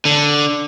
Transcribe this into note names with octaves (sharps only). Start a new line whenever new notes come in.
D3